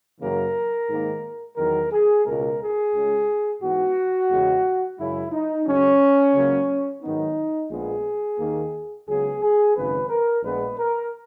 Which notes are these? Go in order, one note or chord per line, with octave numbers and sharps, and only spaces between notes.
F#2 C#3 E3 A#3 A#4
G#2 D#3 A#3
E2 D#3 F#3 A#4
G#4
C#2 B2 G#3 A#4
G#4
C#2 C#3 G#3
G#2 E3 B3 F#4
E2 C#3 G#3 B3
F#2 C#3 G#3 E4
D#4
C#2 C#3 F#3 C#4
C#2 C#3 F#3 A#3
G#2 D#3 F#3 B3 D#4
A#1 A#2 G#3 B3 G#4
D#2 D#3 A#3
C#2 C#3 F#3 B3 G#4
G#4
G#1 F#2 C#3 B4
A#4
A#1 A#2 G#3 B3 B4
A#4